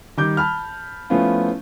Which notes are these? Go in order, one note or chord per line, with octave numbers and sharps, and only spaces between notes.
D#3 G3 D6 G6
A5 B5 F6
F3 A3 B3 C#4 E4 F4